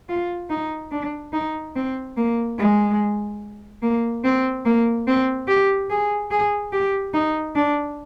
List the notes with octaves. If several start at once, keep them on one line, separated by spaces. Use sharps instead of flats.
F4
D#4
D4
D#4
C4
A#3
G#3
A#3
C4
A#3
C4
G4
G#4
G#4
G4
D#4
D4